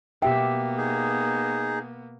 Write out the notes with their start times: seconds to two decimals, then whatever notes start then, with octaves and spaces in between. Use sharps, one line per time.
0.22 B2 A#3 B3 G4 E5 G5
0.77 D#4 G#4